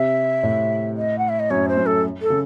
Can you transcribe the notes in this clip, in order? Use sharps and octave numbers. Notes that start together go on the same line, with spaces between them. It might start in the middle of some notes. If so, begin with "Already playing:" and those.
Already playing: C3 E5
A2
D#5
F#5
E5
D#5
F#2 C#5
C5
F#2
A4
A4
C#3